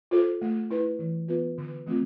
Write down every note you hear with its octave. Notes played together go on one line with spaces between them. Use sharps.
F4 A4 C5
A3
E4 B4
E3
B3 F4 B4
D3
F3 A3 C4 F4